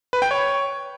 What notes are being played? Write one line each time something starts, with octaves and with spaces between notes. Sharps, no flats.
B4
G5
C#5